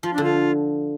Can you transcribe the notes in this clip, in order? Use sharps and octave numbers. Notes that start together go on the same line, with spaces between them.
F3 F4
D3 D4
F4